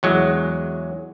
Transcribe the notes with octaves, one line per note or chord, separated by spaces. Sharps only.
E2 F#3 G#3